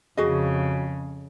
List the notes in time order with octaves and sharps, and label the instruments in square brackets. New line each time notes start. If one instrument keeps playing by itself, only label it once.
[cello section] F2 C#3 [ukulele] F#4 G#4 D#5